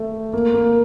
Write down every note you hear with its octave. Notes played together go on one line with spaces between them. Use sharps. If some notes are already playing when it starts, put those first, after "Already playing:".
Already playing: A3
A#3
A#3